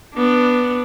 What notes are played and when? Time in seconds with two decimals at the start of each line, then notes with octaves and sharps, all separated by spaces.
0.14 B3 D4